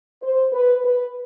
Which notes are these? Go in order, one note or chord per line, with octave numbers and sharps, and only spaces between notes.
C5
B4
B4